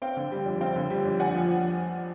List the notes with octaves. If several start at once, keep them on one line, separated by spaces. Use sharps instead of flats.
C4 F5 G5
D3
G3
F2
C4 F5 G5
D3
G3
F2
D4 F#5 G#5
F3